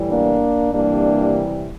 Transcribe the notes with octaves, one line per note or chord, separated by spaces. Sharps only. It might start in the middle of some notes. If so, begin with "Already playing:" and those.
Already playing: A2 E3 G3
A#3 D4
C3 E3 G3 A#3 D4